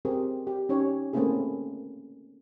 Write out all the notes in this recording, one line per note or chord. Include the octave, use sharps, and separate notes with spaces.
C4 G4 G#4 A#4
G4
C#4 D#4 G4 C#5
A3 A#3 C4 C#4 E4 G#4